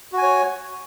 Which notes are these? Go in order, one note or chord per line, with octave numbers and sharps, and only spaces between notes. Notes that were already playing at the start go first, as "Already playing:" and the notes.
F#4 C#5 G#5